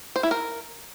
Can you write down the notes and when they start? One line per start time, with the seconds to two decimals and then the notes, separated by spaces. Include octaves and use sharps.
0.16 C5
0.23 E4
0.31 A#4